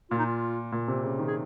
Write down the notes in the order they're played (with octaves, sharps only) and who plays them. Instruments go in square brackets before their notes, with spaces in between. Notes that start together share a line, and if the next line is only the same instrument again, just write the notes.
[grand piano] A#2 [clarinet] F4
[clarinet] D#4
F4
[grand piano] A#2
C3
C#3
D#3
[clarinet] G#4